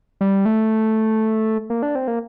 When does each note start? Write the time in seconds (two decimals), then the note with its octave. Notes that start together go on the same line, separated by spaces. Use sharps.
0.21 G3
0.45 A3
1.70 A#3
1.83 D4
1.95 C4
2.08 A#3